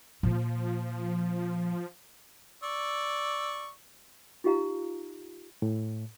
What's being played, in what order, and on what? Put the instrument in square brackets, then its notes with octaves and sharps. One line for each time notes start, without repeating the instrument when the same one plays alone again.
[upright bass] A#2 A#3 [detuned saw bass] F3
[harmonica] D5 C#6 E6
[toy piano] D#4 F4 G4 F5 A#5
[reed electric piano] A2